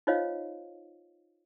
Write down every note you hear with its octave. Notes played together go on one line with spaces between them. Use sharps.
D#4 F4 C5 C#5 D#5 F5